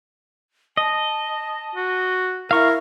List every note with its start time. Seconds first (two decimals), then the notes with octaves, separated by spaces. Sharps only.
0.77 D#5 A5
1.75 F#4
2.51 E4 A#4 F5 C#6